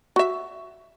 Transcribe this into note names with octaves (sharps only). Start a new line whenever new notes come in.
F#4 E5